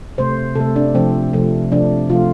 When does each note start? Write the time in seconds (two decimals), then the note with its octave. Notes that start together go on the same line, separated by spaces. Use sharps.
0.18 C3 A3 C5
0.55 C3 A3 A4
0.76 D4
0.95 C3 F3 A3 C4
1.33 C3 F3 A3
1.72 C3 F3 A3 D4
2.09 C3 F3 A3 F4